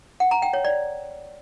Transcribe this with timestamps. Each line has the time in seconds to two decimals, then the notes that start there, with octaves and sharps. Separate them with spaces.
0.20 F#5
0.31 A#5
0.42 G5
0.53 C#5
0.65 D5